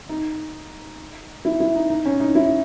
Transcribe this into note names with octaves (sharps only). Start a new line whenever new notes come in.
D#4
E4
E4
D#4
D#4
C#4
D#4
E4